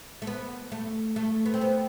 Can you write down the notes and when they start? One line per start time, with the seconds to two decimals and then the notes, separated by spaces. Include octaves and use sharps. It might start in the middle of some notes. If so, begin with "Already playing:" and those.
0.22 A3
0.27 B3
0.72 A3
1.16 A3
1.46 B3
1.54 C4
1.61 B3